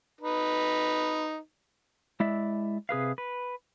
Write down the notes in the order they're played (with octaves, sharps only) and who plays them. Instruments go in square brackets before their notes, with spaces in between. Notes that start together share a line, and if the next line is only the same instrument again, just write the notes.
[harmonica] D#4 B4
[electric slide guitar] G#3 E4 D5 E5
C3 G#4 B4 F5
B4